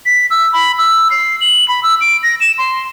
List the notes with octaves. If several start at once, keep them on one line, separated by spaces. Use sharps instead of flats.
B6
E6
B5
E6
C7
F#7
B5
E6
D7
A#6
E7
C6